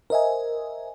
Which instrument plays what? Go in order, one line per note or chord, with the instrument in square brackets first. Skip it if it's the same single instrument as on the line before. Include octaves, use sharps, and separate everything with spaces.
[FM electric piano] A#4 C5 D#5 E5 G#5